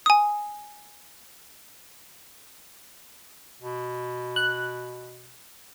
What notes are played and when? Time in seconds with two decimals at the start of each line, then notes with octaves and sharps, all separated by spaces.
0.06 G#5 D#6
3.62 B2
4.36 F#6